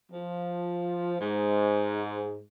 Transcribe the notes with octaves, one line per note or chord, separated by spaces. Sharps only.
F3
G#2